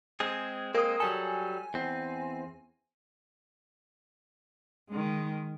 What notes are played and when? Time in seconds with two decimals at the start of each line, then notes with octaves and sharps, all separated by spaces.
0.20 G#3 C4 G#4
0.75 G#3 A#3 C4 A#4 D#6
1.00 F#3 G3 A4 G#5
1.74 E2 C4
4.90 D#3 G#3